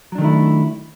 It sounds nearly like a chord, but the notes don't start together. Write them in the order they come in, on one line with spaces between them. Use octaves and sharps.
F#3 D4 D#3 A3 E4